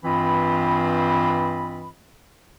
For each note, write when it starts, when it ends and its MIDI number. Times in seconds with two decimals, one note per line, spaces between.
0.04 1.89 43
0.04 1.89 52
0.04 1.89 60
0.04 1.89 65
0.04 1.89 75
0.04 1.89 83